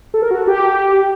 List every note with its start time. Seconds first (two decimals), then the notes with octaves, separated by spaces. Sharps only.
0.14 A4
0.22 A#4
0.31 F#4
0.39 A4
0.47 G4